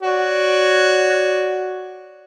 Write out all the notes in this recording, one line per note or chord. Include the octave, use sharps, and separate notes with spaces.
F#4 C#5 D5